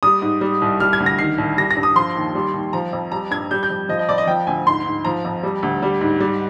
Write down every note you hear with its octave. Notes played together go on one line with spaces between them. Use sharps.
G3 D#6
G#2
G3
C2
G3 F6
G#6
D2
A#6
D#3 C7
C2
G3 A#6
A#6
G2
D#6
F3 C6
D#2
G3
D#2
F3 A#5
F2
G3 A#5
G2 G#6
G3 G6
G6
F2
F3 D#5
D#5
F2 D5
D#5
F3 G5
D2 G#5
G#2 C6
G#2
F3 A#5
F2
G3
D2
G3
G#2
G3